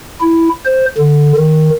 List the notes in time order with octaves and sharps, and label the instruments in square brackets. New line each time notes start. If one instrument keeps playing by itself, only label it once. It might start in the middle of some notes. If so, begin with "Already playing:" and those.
[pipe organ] E4
C5
D3
D#3